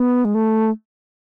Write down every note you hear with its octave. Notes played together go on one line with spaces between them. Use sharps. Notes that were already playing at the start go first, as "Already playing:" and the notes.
Already playing: B3
G#3
A3